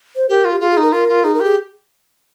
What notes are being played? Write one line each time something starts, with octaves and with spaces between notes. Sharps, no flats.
C5
G4 A#4
F4
G4
F4 G#4
G#4
D#4
A#4
F4 A#4
F4
D#4 G#4
A#4
G4 G#4